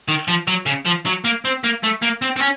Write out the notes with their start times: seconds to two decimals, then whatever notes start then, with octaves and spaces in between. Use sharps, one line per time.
0.08 D#3
0.28 F3
0.48 F#3
0.66 C#3
0.86 F3
1.06 F#3
1.25 A#3
1.45 C4
1.64 A#3
1.83 A3
2.02 A#3
2.22 C4
2.37 C4
2.41 C#4